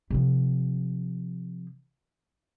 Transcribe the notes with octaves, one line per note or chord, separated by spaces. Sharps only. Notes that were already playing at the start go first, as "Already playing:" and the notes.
C3 F3